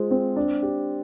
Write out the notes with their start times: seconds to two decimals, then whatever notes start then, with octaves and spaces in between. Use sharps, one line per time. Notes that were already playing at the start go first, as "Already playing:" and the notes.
Already playing: G#3 F4 C5
0.11 C4
0.36 D4
0.63 G4